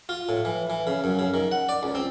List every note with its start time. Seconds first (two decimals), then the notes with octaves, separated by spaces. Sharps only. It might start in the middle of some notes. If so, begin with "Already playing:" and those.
0.09 F4
0.29 A2
0.45 E3
0.70 E3
0.87 C#3
1.04 F#2
1.19 C#3
1.34 D#3
1.52 F#5
1.69 D5
1.83 C#2
1.95 C4